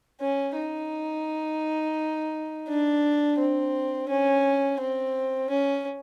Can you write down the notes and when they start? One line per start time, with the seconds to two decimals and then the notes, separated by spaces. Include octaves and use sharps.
0.21 C#4
0.56 D#4
2.68 D4
3.38 C4
4.09 C#4
4.80 C4
5.50 C#4